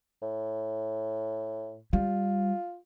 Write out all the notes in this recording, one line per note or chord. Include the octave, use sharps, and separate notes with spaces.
A2
G3 F4